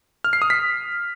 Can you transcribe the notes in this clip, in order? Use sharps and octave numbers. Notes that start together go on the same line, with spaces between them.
F6
C7
D#6
B6